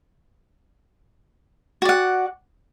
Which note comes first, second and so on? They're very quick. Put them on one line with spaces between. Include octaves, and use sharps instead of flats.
F#4 D5 F#5